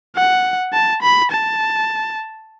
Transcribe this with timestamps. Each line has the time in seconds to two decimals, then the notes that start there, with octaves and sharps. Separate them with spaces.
0.16 F#5
0.73 A5
1.02 B5
1.31 A5